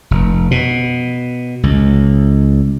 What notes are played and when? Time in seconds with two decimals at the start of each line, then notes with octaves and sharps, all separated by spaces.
0.11 F1
0.51 B2
1.63 C#2